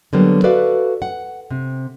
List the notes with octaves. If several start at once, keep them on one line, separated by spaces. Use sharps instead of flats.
D3 F#3 G3 A#3 B3
F#4 A4 B4 D5 E5 F5
F#5
C3